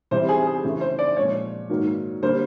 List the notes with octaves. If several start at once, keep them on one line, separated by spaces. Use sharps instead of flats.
C3 E3 G3 C5
G#4
G#4
F#2 C#3 E3 A3
C5
D5
A#2 F3 G#3 C#5
G#2 D#3 F#3 A#3
D3 G3 A#3 C5